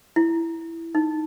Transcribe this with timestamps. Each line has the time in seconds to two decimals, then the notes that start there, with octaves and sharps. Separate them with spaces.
0.16 E4
0.95 D#4